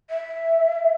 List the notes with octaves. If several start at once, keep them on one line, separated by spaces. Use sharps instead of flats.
E5